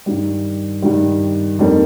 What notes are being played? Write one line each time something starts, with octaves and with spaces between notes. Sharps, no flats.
G2 D#3 G3
G2 D#3 G3
F2 D#3 G3 A#3 D4